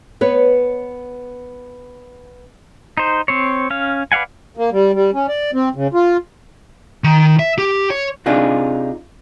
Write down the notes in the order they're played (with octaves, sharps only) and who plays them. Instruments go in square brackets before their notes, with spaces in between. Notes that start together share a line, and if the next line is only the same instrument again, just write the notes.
[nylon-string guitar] B3 B4 C#5
[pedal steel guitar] D#4 C5
C4 C5 C#5
C#4 F5
B4 D5 F5 F#5 G#5
[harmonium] A#3
G3
G3
C#4
D5
C4
C#3
F4
[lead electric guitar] D#3
E5
G4
C#5
[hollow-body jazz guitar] C3 D4 D#4 F4 G#4